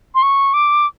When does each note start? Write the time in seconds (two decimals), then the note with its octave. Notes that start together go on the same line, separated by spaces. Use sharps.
0.15 C6
0.22 C#6
0.54 D6